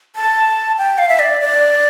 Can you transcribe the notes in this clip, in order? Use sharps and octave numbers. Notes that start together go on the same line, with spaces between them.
A5
G5
F5
E5
D5
D5